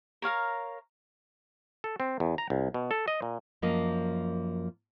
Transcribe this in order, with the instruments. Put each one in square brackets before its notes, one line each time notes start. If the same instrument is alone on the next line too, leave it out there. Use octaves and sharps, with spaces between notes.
[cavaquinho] A#4 C#5 F5 A#5
[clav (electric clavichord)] A4
C4
E2
A#5
C2
B2
A4
D#5
A#2
[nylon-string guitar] F#2 F3 A#3 D#5